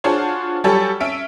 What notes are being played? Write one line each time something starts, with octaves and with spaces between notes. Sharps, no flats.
D4 F4 F#4 G#4 C5 C#5
F#3 G3 G4 A4 C#5 G#5
C#4 E5 D7